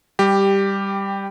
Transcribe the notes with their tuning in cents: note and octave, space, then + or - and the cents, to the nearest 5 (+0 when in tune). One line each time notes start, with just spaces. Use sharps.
G3 +10 G4 +0